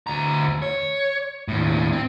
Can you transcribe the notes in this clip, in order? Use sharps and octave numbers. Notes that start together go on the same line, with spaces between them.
D2 A#5
C#5
D#2 A2
C4